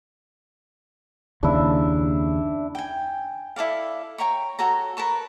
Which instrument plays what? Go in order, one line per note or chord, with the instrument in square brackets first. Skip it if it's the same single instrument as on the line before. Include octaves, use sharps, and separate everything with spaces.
[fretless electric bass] F#1 D#2 C#3 [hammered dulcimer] D4 E4
[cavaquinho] G5 G#5
E4 A4 D5 F5
C#5 G5 A#5 C#6
F#4 A4 C#5 A#5
A#4 B4 A5 C#6